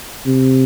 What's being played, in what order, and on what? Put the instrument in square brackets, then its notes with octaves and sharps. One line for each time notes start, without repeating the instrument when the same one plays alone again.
[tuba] C3